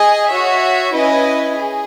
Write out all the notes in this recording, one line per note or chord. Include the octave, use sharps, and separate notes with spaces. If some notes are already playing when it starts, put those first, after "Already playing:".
Already playing: G#4 D#5 G#5
F#4 C#5 E5
C#4 E4 B4 D#5 G#5
G#4